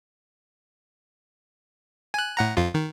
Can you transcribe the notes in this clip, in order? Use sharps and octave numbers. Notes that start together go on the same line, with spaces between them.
G#5 F#6
A2 F#5 A#5
F2 F4
D#3